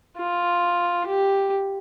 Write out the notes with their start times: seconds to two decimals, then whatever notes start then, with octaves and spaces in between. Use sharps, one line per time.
0.19 F4
1.06 G4